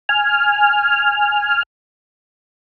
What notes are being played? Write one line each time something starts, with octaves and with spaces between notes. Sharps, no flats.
G#5 F6